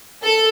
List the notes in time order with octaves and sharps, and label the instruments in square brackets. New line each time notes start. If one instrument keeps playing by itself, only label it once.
[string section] A4